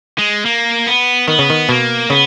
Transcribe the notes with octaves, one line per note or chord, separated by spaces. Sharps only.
G#3
A#3
B3
D#3 B3
C#3
D#3
B2 A#3
C#3 B3